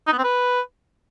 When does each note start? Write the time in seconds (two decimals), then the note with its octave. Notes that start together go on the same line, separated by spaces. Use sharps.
0.07 D#4
0.13 B3
0.18 C4
0.24 B4